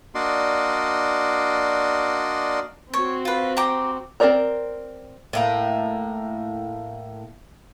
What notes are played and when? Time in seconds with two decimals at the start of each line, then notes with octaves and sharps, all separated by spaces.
0.15 A#3 D4 F#4 D5 D#5 C6
2.94 C4 F#4 C#5
3.25 F4 B4
3.57 G4 A#5 D6
4.20 C4 A4 A#4 D5 A#5
5.33 A2 A#3 A#5